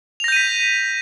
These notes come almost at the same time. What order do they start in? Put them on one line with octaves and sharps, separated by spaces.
F7 A#6 G6 D#7 B6